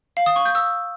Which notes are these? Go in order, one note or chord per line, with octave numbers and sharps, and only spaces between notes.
F5
D#6
C#6
G6
E6